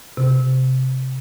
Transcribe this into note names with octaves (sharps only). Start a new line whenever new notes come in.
C3